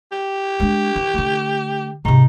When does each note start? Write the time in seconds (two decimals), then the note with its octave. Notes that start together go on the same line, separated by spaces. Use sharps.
0.12 G4
0.60 G#3 D4
0.96 E3
1.14 D3 A3
2.05 G#2 C3 D#4